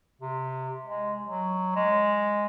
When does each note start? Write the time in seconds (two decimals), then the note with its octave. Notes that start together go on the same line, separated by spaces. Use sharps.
0.21 C3
0.85 G#3
1.28 F#3
1.76 G#3